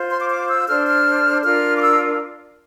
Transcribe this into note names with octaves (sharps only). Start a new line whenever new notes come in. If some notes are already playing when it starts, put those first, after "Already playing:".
Already playing: F4 C5
C6
D6
D6
E6
D4 A4 C5 F6
F6
D4 F4 A#4 F6
D6
E6